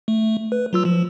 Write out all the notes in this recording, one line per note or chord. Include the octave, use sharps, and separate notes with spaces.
A3
B4
F#3 F4 E6
F3